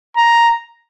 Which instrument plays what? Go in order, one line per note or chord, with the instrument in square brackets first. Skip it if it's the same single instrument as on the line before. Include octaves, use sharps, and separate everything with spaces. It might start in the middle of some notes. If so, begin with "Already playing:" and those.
[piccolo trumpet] A#5